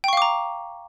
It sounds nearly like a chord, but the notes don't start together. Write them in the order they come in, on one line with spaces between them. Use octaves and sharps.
G5 C#6 F5 D6 A#5